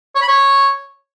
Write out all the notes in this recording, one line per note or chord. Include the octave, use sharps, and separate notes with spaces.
C#5
B5
C#5